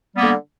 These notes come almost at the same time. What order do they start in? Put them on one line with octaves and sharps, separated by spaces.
G3 B3 A#3 D3